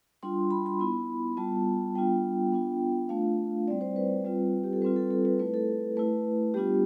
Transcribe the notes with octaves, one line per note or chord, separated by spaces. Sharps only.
G3 D4 F4 C6
B5
C6
B3 E4 B5
G3 B3 F4 A5
G3 B3 D4 F4 G5
B3 D4 F4
A3 D4 F4 F5
G3 C4 E4 D5
C5
B4
G3 C4 F4
G4
A4
G3 C4 F4 B4
A4
A4
B4
A3 E4 B4
A4
A3 E4 B4
G3 B3 D4 F4 G4